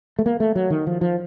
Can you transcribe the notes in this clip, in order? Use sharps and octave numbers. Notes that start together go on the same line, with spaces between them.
A3
A#3
A3
F#3
D#3
F3
F3